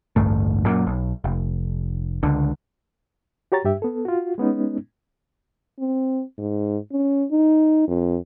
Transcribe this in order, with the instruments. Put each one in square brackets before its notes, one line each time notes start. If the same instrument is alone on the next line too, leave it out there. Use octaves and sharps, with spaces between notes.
[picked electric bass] A1 D2 G2 A3
F#2 A#2
B1
F1
C#2 D3
[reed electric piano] F#4 G4 C#5 A#5 A6
G2 G4 E5
B3 A4
F4 F#4
G#3 B3 C#4 D#4
[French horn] C4
G#2
C#4
D#4
F2